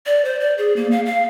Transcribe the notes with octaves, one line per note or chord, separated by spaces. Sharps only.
D5
C5
D5
G#4
A#3
F5
F5